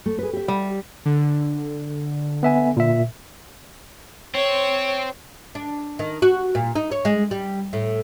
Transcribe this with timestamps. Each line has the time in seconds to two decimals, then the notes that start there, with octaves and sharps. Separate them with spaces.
0.06 A3
0.19 G#4 B4
0.33 G4 E5
0.48 G3
1.05 D3
2.43 B3 E5 G#5
2.77 A#2 E5
4.35 C4 C#5
5.55 D4
5.99 D#3
6.22 F#4
6.55 A#2
6.76 D#4
6.92 C#5
7.05 G#3
7.31 G3
7.73 A2